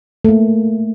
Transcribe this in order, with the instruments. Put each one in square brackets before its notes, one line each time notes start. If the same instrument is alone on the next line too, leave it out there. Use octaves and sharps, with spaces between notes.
[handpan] A3 A#3